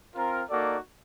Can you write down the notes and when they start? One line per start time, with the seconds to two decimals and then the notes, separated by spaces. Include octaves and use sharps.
0.14 C4 F4 A#4
0.50 A#3 D#4 F#4 A4 D5